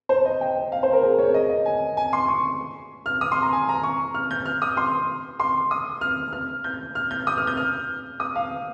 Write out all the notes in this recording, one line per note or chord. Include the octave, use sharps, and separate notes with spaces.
C5
D#5
G5
F5
C5
A#4
G#4
C#5
D#5
D#5
G#5
G#5
C6
C#6
F6
D#6
C6
A#5
G#5
A#5
C#6
F6
G6
F6
D#6
C6
C6
D#6
F6
F6
G6
F6
G6
D#6
F6
G6
F6
D#6
F5